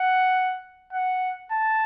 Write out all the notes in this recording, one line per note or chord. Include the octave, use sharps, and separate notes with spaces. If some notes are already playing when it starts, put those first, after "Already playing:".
Already playing: F#5
F#5
A5